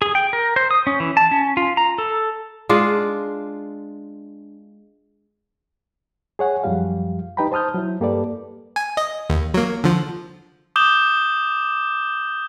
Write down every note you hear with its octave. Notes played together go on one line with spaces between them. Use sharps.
G#4
G5
A#4
C5
D#6
C#4
E3
A5
C#4
F4
A#5
A4
G#3 D4 F4
G#4 C#5 F#5 G#5
F#2 F3 G3 G4 F5
D#4 G4 B4 G5 A#5 B5
C5 A5 D#6 F6 G6
F#3 E4
G2 A#3 G4 A4 B4 D5
G#5
D#5
D#2
F#3 A#3
D3 F3
D6 D#6 G6 E7 G7